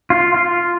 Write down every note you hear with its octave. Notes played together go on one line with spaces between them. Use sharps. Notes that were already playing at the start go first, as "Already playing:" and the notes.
F4
F4